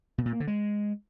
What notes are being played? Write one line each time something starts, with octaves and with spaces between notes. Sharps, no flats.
B2
A#2
A#3
D3
G#3